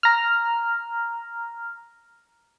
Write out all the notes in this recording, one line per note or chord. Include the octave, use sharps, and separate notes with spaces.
A#5 F6